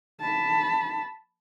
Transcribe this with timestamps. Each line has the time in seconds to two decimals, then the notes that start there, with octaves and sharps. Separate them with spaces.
0.21 A5 B5